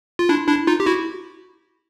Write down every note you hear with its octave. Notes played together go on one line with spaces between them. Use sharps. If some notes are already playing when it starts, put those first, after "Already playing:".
F4
D4 E4
D4 E4
D#4 F4
G4
E4 F#4